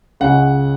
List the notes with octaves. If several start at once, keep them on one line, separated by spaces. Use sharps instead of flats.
C#2 C#3 G#3 C#4 F#5